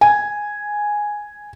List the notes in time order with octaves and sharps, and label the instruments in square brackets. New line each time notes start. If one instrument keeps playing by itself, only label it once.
[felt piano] G#5